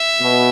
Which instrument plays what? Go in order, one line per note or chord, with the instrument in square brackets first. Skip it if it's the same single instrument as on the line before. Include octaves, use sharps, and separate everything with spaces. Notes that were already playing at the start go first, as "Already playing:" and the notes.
Already playing: [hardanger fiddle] E5
[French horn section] B2